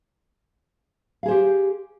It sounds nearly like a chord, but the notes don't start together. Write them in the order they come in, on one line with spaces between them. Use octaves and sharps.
F5 G#4 C5 G4